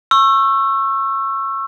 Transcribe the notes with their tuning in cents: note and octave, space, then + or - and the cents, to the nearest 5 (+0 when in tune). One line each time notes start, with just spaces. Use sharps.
C#6 -20 E6 +20